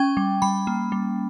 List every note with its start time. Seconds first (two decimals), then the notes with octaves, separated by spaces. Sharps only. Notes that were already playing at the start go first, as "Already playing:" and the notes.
Already playing: C#4 G5
0.17 G3
0.42 G3 B5
0.67 A#3
0.92 G3